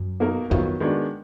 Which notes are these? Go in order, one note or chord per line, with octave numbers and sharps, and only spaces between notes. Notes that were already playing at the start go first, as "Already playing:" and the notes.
Already playing: F#2
B2 A#3 D#4 A#4
F2 D#3 F#3 B3 F4
D#3 G#3 B3 D4 F#4